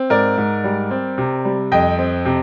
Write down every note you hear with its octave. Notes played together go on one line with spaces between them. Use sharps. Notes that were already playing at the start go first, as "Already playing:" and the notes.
Already playing: C4
G#2 A#4 D5
G#2
G3
C4
C3
G3
F2 D#5 G5
C4
C3